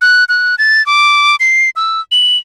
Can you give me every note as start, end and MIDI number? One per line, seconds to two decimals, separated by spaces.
0.01 0.24 90
0.29 0.55 90
0.58 0.85 93
0.86 1.36 86
1.40 1.70 96
1.76 2.01 88
2.12 2.37 102